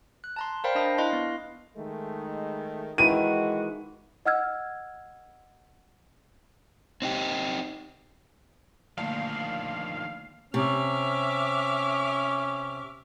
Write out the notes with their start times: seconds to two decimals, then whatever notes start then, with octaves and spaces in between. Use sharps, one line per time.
0.24 F#6
0.36 A5 A#5 C6
0.64 A#4 C5 D5 F5 G5 B5
0.75 D4 D#5 A5 D#6 A#6
0.98 E4 D#5 F5 C6 F#6
1.13 B3
1.77 D#3 G#3 A3
2.98 D#3 E3 G#3 E4 F#4 D#7
4.26 D#5 F#5 E6 F6 G#6
7.02 C4 D#4 G4
8.98 D3 D#3 F3 A3 A#3 D4 F5
10.54 C3 C#4 E5 D6 F6